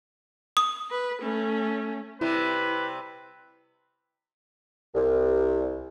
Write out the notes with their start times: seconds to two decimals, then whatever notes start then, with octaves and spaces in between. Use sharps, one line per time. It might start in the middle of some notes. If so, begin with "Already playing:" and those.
0.57 D#6
0.90 B4
1.21 A3 C#4
2.21 C3 G3 E4 B4
4.94 C2